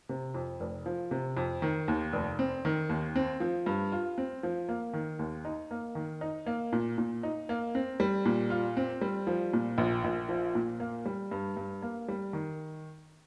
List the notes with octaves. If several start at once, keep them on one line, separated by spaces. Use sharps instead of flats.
C3
F2
F1
F3
C3
F2
D#3
D#2
F1
C4
D#3
D#2
C4
F3
G2
F4
C4
F3
A#3
D#3
D#2
D#4
A#3
D#3
D#4
A#3
A#2
A#2
D#4
A#3
C4
G3
A#2
F4
C4
G3
F3
A#2
A#1
A#1
F3
A#2
A#3
G3
G2
G2
A#3
G3
D#3